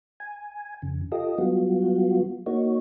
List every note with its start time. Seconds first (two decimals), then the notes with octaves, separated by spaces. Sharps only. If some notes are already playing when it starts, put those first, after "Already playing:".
0.20 G#5
0.82 F2 C#3
1.12 F4 G4 A4 D#5
1.38 F#3 G3 B3 F4 F#4
2.46 A#3 D#4 F#4 C#5